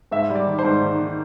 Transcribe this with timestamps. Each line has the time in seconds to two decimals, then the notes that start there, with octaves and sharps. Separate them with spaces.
0.11 G#2 E5
0.30 G3
0.35 D5
0.47 D#3
0.59 C5
0.64 G#2
0.82 D#3
1.00 D#3